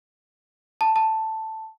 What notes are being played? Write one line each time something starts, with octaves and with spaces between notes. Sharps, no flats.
A5
A5